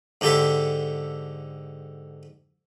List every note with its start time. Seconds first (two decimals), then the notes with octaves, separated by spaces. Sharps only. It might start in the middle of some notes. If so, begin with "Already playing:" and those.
0.21 G#2 D3 G4 A4 E5 C6